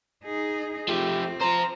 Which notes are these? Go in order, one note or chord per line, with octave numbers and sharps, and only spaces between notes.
D#4 G#4
F3 A3 C4 G4
F4 C5 A#5